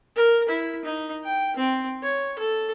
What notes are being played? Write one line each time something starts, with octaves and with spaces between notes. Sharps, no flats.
A#4
E4
D#4
G5
C4
C#5
A4